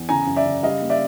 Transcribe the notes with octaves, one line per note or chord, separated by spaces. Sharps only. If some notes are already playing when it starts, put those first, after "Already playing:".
Already playing: E2
C#3 G#5 A#5
F#2
D5 E5
C#3
G3 D#5 F5
A#3
D5 E5